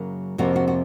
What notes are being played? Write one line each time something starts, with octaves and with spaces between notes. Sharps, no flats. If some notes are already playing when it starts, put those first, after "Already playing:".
Already playing: F#2 C#3 F#3 A#3
F2 C3 F3 A#3 F#4
F#4
F#4